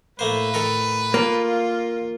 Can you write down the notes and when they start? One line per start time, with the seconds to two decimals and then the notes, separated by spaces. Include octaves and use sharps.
0.19 A2 A3 A#3 B4 C5
0.54 D#3 A4 A#4
1.14 A#3 F4